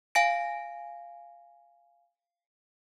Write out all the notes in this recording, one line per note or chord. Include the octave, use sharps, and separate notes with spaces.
F5 G#5 A#6 D7